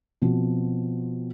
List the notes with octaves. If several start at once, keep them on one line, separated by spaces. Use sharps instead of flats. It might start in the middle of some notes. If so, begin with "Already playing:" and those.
B2 F3 C4 F#4